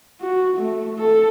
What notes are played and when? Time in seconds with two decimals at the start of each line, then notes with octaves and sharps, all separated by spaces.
0.21 F#4
0.57 A3
0.99 A4